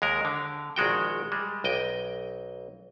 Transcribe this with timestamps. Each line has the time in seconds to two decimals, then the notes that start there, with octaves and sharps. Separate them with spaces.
0.02 D#2 G#3 A#4
0.25 D3
0.76 A#1 D#3 G#3 F#4 G5
1.32 G3 G#3
1.64 B1 D#5 G5